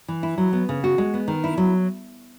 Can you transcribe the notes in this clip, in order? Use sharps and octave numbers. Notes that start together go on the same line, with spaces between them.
E3
E4
F#3
B3
C#3
F#4
G#3
B3
D#3
E4
F#3